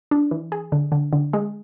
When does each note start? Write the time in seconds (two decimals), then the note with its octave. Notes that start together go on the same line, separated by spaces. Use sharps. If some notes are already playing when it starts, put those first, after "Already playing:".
0.11 D4
0.31 E3
0.52 G#4
0.72 D3
0.92 D3
1.13 D3
1.33 G#3